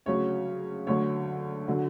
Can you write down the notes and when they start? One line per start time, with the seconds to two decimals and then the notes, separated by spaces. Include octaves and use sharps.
0.06 D2 C#3 F#3 C#5
0.87 D2 D3 F#3 C#5
1.68 D3 F#3